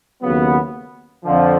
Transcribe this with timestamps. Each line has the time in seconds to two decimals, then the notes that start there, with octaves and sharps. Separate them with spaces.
0.22 D#2 C#3 F#3 B3
1.24 F2 D3 F3